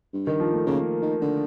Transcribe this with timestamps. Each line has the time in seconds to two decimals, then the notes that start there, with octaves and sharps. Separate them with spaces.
0.14 G2
0.27 D#3
0.40 F3
0.53 A3
0.67 C#3 A#3
1.02 D#3
1.22 D3